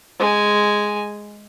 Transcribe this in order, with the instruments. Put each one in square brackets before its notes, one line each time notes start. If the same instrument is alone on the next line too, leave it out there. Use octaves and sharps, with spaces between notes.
[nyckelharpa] G#3 G#5